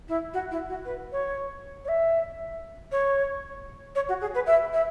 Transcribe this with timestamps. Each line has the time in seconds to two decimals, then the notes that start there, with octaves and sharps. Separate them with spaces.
0.09 E4
0.34 F#4
0.51 E4
0.69 F#4
0.85 B4
1.12 C#5
1.85 C#5
1.88 E5
2.92 C#5
3.95 C#5
4.09 F#4
4.21 G#4
4.35 B4
4.46 E5
4.73 E5